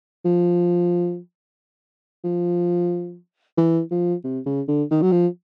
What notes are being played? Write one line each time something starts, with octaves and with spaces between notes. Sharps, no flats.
F3
F3
E3
F3
C3
C#3
D3
D#3
F#3
F3